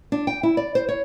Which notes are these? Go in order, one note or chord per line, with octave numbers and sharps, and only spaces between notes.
D4
G5
E4
D5
C5
C#5